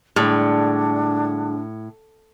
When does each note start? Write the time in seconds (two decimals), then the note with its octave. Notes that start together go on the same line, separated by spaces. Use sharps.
0.16 A2 D3 G3 G#3 D4